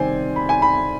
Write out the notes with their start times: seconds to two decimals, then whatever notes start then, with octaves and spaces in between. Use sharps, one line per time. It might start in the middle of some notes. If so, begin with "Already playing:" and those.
Already playing: C3 D#3 G3 C4 C5 D5 G#5
0.36 B5
0.49 G#5
0.62 B5